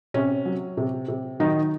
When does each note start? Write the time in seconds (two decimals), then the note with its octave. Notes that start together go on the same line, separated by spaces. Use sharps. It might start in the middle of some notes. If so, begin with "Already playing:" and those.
0.14 C3 C#4
0.45 F#3
0.77 C3
1.08 C3
1.40 D#3 F#3 D#4